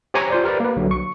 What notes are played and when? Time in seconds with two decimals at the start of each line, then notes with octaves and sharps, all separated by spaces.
0.14 G4 C5 C#5 G#5 A#5 C#6
0.30 F4 C5 D5
0.44 G4 A#4 B4 D5
0.60 A#3 B4
0.76 B1 D3 F#3
0.91 C#6